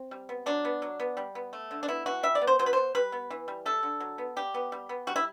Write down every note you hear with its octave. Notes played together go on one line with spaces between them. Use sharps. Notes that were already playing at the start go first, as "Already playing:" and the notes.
Already playing: C4
G3
B3
F#3 D4
B3
F#3
B3
G3
B3
A3
D3
D4
B3 E4
E3 F#4
G3 E5
D5
B3
C5
F#3 C5
B4
B3 C5
G3 B4
B3
E3
G3
A3 A4
D3
F#3
B3
G3 G4
B3
G3
B3
G3 F#4
E4